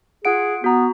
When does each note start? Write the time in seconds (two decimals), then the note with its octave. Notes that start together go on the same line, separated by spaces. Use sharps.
0.25 F4 G#4 F#5 D7
0.64 B3 F#4 A#5